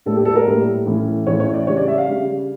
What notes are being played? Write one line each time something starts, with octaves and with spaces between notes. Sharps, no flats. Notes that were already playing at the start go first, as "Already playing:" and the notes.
A2 G3 A#3 D4 A4
G4
A4
A#4
A2 G3 A#3 D4
A2 E3 A3 C#4
A2 E3 A3 C#4 C#5
C#5
D5
C#3 G3 D4 C#5
D5
E5
F5
C#3 G3 D4